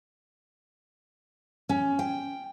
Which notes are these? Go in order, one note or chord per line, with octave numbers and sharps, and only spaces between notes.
C#4
G5